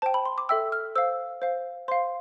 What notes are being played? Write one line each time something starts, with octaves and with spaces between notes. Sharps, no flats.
C5 G5 A5
B5
C6
D6
A4 E5 G5 E6
F6
C5 F5 E6
C5 F5
C5 F5 C6